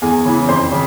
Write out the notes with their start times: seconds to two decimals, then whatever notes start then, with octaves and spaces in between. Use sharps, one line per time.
0.02 E2 G#4 G#5
0.25 C#3 E3
0.48 F2 C5 C6
0.72 C#3